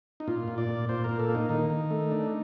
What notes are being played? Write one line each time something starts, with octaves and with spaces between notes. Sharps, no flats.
D#4
A#2 F4
A#2
D5
A#2
A#2 C5
A#2 A#4
A4
A#3
D#4
D#3 D#4
D#3
A3
D4